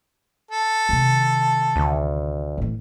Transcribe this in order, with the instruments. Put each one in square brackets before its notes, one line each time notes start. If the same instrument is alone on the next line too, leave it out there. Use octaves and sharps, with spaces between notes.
[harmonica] A4
[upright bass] C3 D#3
[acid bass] D2
[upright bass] A2 E3